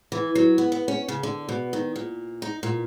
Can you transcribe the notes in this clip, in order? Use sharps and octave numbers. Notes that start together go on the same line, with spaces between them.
E3
F#3
B3
B3
C#4
C#3
D3
B2
D#3
A#2
D#4
A#2